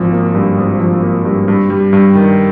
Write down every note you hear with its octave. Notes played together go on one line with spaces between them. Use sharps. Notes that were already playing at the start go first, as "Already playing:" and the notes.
Already playing: G#1 F3
A#3
G2
G#1
F3
A#3
G2
G2
G3
G2
D#3